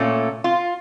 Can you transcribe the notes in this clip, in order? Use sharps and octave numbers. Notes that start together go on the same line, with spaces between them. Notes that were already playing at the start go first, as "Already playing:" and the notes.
Already playing: A#2 A3 C#4
F4